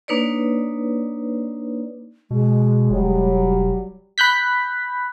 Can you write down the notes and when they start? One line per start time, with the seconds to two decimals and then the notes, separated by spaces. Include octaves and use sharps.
0.08 A#3 D4 D#4 B4 C#5 D5
2.31 B2 G#3
2.90 E1 F#3 G3
4.18 B5 F#6 G6 B6